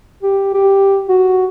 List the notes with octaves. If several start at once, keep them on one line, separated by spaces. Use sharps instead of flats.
G4
G4
F#4